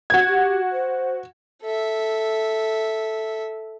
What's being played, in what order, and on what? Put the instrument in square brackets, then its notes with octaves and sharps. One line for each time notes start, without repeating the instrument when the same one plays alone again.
[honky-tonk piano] F#4 G#6
[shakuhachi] G4
C5
[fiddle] A4 E5